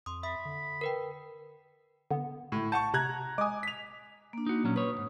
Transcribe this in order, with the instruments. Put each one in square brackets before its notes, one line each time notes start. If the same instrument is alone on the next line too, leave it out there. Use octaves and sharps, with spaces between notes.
[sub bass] F2 [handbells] C6 D#6
[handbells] E5 D#6 [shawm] B5
[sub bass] D3
[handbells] A#4 B4 G5
[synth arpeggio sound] D3 B3
[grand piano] A2
[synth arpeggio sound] F#5 G6 [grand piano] A5 C#6
[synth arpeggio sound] C3 [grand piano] A#5 F#6 G#6
[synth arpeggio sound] G#3 D#6 [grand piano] G#5 D6
[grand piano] B6 F7
[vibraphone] A#3 D4
[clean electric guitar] D#4 F#4
A#2 F#3 C#4
[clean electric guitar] B4 C#5 [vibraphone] D#6
[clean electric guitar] B1 G#2